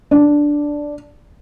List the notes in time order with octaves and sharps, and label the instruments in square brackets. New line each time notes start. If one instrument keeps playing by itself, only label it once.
[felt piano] D4